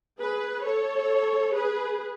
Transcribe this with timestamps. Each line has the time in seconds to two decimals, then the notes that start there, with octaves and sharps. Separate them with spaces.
0.20 G#4 B4
0.65 A4 C#5
1.55 G#4 B4